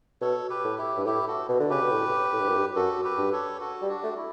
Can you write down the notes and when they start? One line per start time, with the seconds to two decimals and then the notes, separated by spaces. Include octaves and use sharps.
0.21 B2 A4 C#5
0.50 G4 B4
0.64 A2
0.78 E4 G4
0.97 G2
1.06 A2 E4 G4
1.28 F#4 A4
1.49 B2
1.59 D3
1.70 C#3 G4 B4
1.81 B2
1.92 A2
2.33 A2
2.41 G2
2.48 F#2
2.56 G2
2.76 F#2 F#4 A4
3.04 G4 B4
3.18 G2
3.32 A4 C#5
3.61 F#4 A4
3.82 G3
3.89 D4 F#4
4.04 A3
4.17 E4